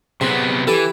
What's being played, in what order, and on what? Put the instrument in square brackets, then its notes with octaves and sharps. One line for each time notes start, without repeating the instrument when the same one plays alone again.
[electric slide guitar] C3 F#3 B3 [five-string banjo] C4 [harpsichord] G#4
[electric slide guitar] E3 [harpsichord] G4 B4 G5 [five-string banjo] A4